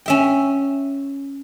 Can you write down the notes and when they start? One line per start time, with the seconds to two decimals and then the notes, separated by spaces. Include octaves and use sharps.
0.06 C#4 E5 G5